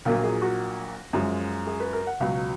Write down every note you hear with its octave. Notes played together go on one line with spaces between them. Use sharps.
A#1 A#2 F#3 A#3 F4
G#4
F#4
F#2 F3 G#3
G#4
B4
A#4
F#5
C#2 B2 F#3 F5